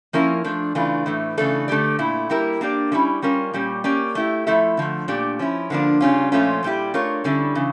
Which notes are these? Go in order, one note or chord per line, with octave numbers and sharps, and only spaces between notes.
F3 A#3 C#4 E4 A#4
F3 A3 D4
C#3 E3 A3 D4 F4
A2 E3 A3
C#3 E3 A3 D4 A4
D3 A3 E4 G4 D5
A#2 A3 E4
G3 A#3 E4 G4 A#4
A#3 D4 G4 D5
D3 G3 C#4 E4
G3 C#4 F4 A#4
A#2 G3 C#4 G4
A#3 C#4 G4 D5
A3 E4 G4
F3 A3 E4 A4 E5
D3 F3 A3
A#2 A3 D4 G4 D5
F3 C#4 E4
D3 F3 A#3 D4
C#3 G3 C#4 F4
A#2 F3 A3 C#4 F4
A#2 G3 C#4 E4 G4
A3 D4 F4 A#4 C#5
D3 G3 C#4 E4 A4
C#3 E3